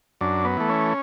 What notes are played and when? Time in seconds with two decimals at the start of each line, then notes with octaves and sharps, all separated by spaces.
0.21 F#2 D4
0.45 B3
0.57 E3 A3
0.69 C#4